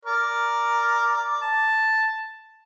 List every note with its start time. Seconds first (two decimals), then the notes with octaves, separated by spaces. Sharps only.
0.05 A#4 D5
1.41 A5